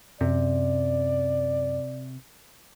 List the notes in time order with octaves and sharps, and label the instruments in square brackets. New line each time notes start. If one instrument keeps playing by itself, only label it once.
[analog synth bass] F#2 [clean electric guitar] C3 [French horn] D5